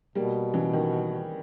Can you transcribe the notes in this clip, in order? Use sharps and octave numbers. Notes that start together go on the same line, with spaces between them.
B2 G3 A#3
C#3 E3
D#3